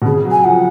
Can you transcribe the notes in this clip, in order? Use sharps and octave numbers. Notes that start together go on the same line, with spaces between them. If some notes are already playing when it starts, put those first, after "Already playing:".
B2
C#3 G#4
F#3
G#5
F3 F#5